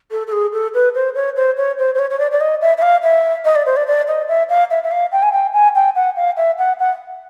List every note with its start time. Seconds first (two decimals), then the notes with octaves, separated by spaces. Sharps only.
0.11 A4
0.27 A4
0.32 G#4
0.53 A4
0.74 B4
0.95 C5
1.15 C#5
1.36 C5
1.57 C#5
1.79 C5
1.95 C5
1.99 C#5
2.10 C#5
2.19 D5
2.32 D5
2.41 D#5
2.62 E5
2.77 E5
2.82 F5
3.03 E5
3.45 D#5
3.56 D5
3.66 C5
3.76 D5
3.87 D5
4.07 D#5
4.29 E5
4.49 F5
4.71 E5
4.84 E5
4.91 F5
5.12 G5
5.23 G#5
5.32 G5
5.54 G#5
5.75 G5
5.96 F#5
6.16 F5
6.37 E5
6.58 F#5
6.79 F#5